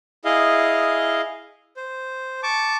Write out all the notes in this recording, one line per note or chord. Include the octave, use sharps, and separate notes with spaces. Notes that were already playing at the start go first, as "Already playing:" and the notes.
E4 G#4 D#5 F5
C5
A5 C#6 D6